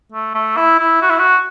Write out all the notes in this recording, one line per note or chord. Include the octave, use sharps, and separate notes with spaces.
A3
A3
E4
E4
F#4
E4
F#4